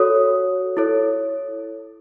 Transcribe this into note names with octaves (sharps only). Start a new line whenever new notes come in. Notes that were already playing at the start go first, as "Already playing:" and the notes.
Already playing: F#4 A4 C#5 D#6
E4 A4 C#5